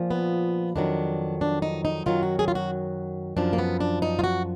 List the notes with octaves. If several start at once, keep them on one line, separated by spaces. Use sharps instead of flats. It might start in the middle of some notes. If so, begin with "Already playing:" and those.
Already playing: A#2 F3
B3
F2 D#3 F#3 D4
D4
D#4
D#4
F#2 D#3 F#3 F4
F#4
G#4
F4
F#4
F#2 F3 D4
A#3
B3
D4
D#4
F4
F#4